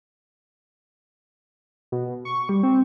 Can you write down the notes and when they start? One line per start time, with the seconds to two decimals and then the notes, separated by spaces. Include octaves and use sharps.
1.92 B2
2.25 C#6
2.49 G3
2.63 C4